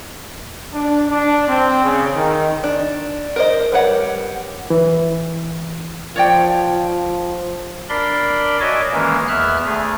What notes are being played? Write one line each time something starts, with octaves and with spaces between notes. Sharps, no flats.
D4
D4
C4
C#3
D#3
D4
A#4 C5 D#5
G3 A#4 B4 C#5 F#5
E3
F3 C#5 D5 G5
D4 A#4 D5 B5 C6
F#4 C#5 D#5 E5 G#5 D6
D#3 E3 G#3 A#3 C#4 A#4
E2 E5 F6 F#6
D2 A3 G#4